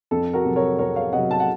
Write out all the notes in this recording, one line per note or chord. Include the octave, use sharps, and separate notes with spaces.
F2 A4
F#4 A#4
C3 F#3
A#4 C#5
F2 A#4 C#5
C#5 F5
C3 F#3 D#5 F#5
A5
F#5